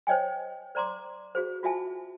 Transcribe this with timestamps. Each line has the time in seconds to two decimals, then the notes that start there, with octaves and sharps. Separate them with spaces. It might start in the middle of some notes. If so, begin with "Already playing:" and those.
0.07 C5 C#5 D#5 G5 G#5
0.75 C5 D5 A#5 C6 D6
1.35 F#4 G#4 C5
1.63 F4 F#4 E5 G#5 A5